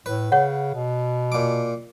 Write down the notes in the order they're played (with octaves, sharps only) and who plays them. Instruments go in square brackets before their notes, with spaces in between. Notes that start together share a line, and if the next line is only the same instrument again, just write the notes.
[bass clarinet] A2 [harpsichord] B4
[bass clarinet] C#3 [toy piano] C#5 F#5
[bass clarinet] B2
[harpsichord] A#2 D6